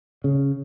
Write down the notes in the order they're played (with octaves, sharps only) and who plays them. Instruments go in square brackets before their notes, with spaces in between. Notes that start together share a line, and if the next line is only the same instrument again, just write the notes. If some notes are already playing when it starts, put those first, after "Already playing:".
[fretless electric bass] C#3